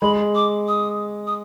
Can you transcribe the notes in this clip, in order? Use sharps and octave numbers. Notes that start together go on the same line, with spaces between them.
G#3 B5
D6
D#6
D#6